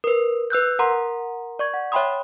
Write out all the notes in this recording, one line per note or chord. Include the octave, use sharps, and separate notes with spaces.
A#4 B4
B4 E6 F#6 G6
A#4 F#5 A#5 C6
D5 C#6 G#6
F#5
C#5 E5 G5 B5 C6 D#6